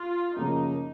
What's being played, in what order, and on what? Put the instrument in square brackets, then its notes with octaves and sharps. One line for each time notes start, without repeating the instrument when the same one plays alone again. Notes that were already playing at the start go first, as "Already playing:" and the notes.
Already playing: [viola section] F4
[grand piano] F#2 C#3 F3 A#3 C#4 [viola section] D#4